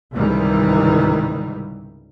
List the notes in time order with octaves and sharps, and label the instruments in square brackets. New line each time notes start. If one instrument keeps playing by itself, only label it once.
[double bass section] C#2 G#2 C3 D#3 E3 G3